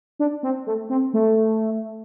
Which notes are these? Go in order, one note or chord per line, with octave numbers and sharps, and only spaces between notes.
D4
C4
A3
C4
A3